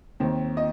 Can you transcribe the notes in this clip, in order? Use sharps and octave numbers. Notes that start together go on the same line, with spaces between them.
D#2 D#3 C4
D#5